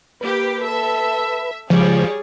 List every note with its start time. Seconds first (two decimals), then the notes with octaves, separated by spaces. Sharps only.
0.21 A#3 G4 B4
0.62 A4 E5
1.70 C#3 F3 G3 G#3 G#4 C#5 D5